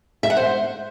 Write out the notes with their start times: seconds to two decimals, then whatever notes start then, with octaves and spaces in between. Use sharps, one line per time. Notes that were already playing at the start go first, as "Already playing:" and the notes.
0.23 E5
0.30 F#5
0.37 C5